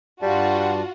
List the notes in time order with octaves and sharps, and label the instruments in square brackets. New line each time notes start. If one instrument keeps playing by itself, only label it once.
[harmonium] G2 D5 A5 [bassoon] G3 [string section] F4 F#4